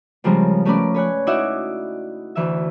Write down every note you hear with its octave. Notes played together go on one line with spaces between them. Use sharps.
C#3 F3 G3 G#3 C4 A#4
A3 C#4 A#4 B4 D5
B4 C#5 G#5 F#6
D#4 E4 F#4 D5 E5 F#5
D2 E3 E5